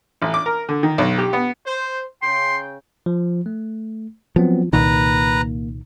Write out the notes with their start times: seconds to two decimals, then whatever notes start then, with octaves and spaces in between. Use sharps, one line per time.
0.22 A1
0.34 D6
0.46 A#4
0.69 D3
0.83 D#3
0.98 B1
1.18 G4
1.33 B3
1.67 C5
2.22 C#3 G5 C6
3.06 F3
3.46 A3
4.36 F3 F#3 B3 C4
4.73 C2 A#2 D#3 A#3 B4 A#5